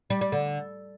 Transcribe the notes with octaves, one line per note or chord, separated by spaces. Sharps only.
G3
G3
D3